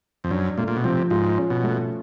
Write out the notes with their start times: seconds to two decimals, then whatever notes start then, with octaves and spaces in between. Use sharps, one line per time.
0.24 F2
0.31 F#2 D4
0.58 A#2 A3
0.68 A#2
0.76 B2
0.84 C3 F3
1.10 G#2 F4
1.38 C#4
1.50 B2
1.64 A3